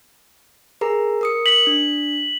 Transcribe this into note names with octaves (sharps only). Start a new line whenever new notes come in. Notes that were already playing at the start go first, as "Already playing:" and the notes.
G#4 A#4 A#5
A#4 D#6 C#7
B6 F#7
D4